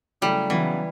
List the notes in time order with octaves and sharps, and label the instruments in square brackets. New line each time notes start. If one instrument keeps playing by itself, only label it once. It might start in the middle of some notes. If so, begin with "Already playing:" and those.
[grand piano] C#3 F#3 A3 E4 [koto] G3
[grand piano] C#3 F#3 B3 [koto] E3